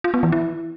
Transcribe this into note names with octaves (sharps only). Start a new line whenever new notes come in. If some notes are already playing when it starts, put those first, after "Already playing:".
F4
B3
E3
E4